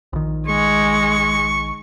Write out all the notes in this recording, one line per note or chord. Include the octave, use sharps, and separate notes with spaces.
A#1 D#3
G#3 C#6